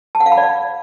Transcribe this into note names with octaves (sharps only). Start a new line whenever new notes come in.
A5
F#5
F5
B5
D5